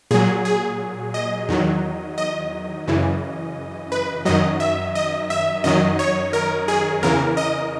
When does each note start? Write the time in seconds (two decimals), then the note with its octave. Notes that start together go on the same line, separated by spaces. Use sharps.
0.11 A#2 F#3 G#4
0.45 G#4
1.14 D#5
1.49 E2 D#3 F#3
2.18 D#5
2.87 F#2 C#3 E3
3.92 B4
4.25 F#2 D#3 F#3 D#5
4.60 E5
4.95 D#5
5.30 E5
5.64 F#2 D#3 F#3 D#5
5.99 C#5
6.33 A#4
6.68 G#4
7.03 E2 C#3 E3 A#4
7.37 D#5